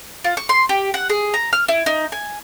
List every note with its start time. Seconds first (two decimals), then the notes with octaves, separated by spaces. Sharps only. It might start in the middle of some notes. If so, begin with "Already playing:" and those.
0.24 F4
0.37 C#6
0.49 C6
0.69 G4
0.94 F#5
1.09 G#4
1.34 A#5
1.53 F6
1.68 E4
1.86 D#4
2.12 G#5